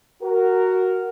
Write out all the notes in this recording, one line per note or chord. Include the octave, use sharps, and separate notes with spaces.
F#4 A#4